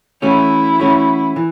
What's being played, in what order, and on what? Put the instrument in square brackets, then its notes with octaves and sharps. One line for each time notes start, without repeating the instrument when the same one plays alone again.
[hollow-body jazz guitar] E3 A3 C#4 F#4 [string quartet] E4
[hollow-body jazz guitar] E3 A3 C#4 F#4
E3